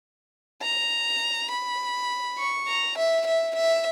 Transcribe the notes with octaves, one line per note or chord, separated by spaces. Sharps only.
A#5
B5
C#6
A#5
E5
E5
E5